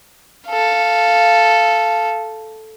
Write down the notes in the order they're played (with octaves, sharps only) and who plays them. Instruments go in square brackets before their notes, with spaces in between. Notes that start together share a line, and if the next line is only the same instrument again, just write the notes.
[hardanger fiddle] A4 F5